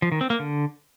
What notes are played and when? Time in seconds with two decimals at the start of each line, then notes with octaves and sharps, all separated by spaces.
0.02 F3
0.12 D#3
0.21 C4
0.30 A#3
0.39 D3